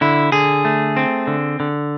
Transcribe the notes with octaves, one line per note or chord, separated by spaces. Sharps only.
D3 E4
D3 G#4
A3
C4
D3
D3